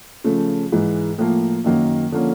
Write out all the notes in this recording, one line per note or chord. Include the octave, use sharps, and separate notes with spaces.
C#3 F3 A3
G#2 E3 G#3
A2 F3 A#3
F#2 D#3 F#3 A#3
D3 F3 A#3 C#4